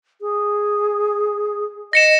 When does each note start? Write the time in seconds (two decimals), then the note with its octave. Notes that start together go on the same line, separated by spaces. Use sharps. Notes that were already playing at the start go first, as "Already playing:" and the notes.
0.21 G#4
1.93 D#5 A#6 C#7 E7